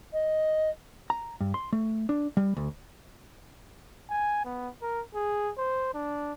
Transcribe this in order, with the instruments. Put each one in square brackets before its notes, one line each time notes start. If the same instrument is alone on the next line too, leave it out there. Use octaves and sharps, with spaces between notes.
[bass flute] D#5
[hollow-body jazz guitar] A#5
G2
C6
A3
D4
G3
D2
[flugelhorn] G#5
B3
A#4
G#4
C5
D4